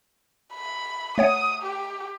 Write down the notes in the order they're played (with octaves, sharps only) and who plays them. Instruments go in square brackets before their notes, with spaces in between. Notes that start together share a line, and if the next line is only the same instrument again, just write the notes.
[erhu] B5
[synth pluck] A3 C#5 F#5 [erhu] D#6
[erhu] G4